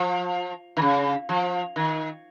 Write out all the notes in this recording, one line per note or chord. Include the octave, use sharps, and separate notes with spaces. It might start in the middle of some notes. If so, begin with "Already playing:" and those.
Already playing: F3
D#3
C#3
F3
D#3